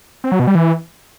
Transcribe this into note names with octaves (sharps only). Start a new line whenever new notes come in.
C4
F#3
B2
G3
E3